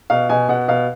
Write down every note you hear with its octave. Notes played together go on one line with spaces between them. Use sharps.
B2 F5
B2 G#5
B2 F#5
B2 F5